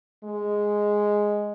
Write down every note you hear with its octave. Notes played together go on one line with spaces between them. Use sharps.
G#3